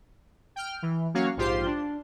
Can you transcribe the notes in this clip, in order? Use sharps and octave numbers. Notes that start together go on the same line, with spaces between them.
G5 F6
E3
F#3 A#3 C#4 F#4 C#5 F5
A#1 G#2 F4 G4 C5 C6
D4